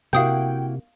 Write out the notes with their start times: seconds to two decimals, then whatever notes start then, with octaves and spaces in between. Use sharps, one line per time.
0.13 C3 A#3 E4 F#4 F5 G5 D#6 G6